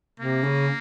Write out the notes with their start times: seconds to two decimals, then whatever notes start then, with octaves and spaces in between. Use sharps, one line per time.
0.20 C3 A#3
0.43 C#3